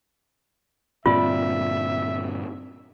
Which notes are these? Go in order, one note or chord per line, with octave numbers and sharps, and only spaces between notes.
G2 A#2 D3 C4 F4 D5 E5